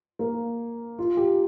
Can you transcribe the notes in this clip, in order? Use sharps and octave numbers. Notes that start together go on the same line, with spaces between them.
A#3
F4
G4